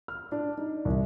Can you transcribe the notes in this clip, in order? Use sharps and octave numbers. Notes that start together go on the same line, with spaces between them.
F6
D4
D#4
C2